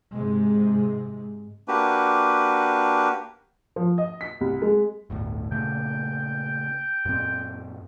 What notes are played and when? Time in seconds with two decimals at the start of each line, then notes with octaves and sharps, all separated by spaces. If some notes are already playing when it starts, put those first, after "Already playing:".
0.14 G#2 C3 G#3
1.68 A#3 D4 F#4 G4 B4
3.76 F3
3.98 D#5
4.21 B6
4.41 C2
4.62 G#3
5.10 G1 D2 A2
5.52 A#2 C#3 A3 G5
7.05 F#2 A#2 C4